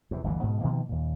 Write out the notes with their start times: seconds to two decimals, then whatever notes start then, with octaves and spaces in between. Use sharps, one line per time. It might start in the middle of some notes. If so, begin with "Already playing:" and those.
0.11 E2 C3
0.24 G1 D2 B2 E3
0.43 G#2 B2
0.61 B2 D#3 F3 A#3
0.89 D#2 A#2